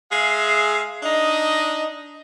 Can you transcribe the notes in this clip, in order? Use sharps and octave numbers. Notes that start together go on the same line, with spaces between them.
G#3 G#4 E5 F5
D4 D#4 D#5